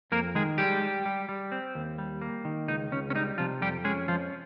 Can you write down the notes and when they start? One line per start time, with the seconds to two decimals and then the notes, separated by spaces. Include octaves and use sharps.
0.12 F2 A#3 A#4
0.35 D#3 G#3 G#4
0.58 G3 G#3 G4
0.82 G3
1.06 G3
1.29 G3
1.52 C4
1.75 D#2
1.98 G3
2.21 A#3
2.45 D#3
2.68 C#2 D#4
2.92 C#2 C#4
3.10 C#4
3.15 G3 D#4
3.38 C3 F3 F4
3.61 F2 G3 G4
3.84 G#3 C#4 G#4
4.08 F2 F3 F4